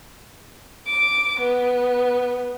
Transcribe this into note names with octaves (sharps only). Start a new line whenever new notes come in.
D6
B3